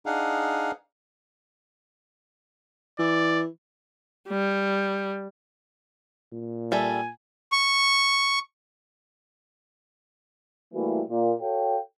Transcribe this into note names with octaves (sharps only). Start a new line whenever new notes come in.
D4 D#4 G#4 F5 F#5
E3 D5
G3
A#2
G3 A4 E5 G#5
C#6
E3 G3 A3 A#3 E4 F#4
A#2
F#4 A4 C#5 F5 G5